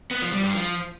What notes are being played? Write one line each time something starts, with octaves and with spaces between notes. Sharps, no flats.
B3
F3
G3
G2
F3